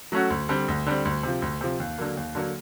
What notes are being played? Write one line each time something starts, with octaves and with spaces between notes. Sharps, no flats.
F#3 A3 C#4 F#4
D2
D3 G3 C4
D2
D3 G3 C4
D2
C3 F3
D2
C3 F3
D#2
D3 F#3 A#3
D#2
D3 F#3 A#3